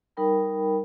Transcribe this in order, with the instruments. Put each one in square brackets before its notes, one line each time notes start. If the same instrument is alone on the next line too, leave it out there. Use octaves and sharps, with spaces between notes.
[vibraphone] G3 D#4 A#4 G5 B5